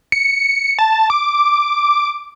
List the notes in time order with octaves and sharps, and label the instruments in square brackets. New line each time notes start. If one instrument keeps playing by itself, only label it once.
[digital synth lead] C#7
A5
D6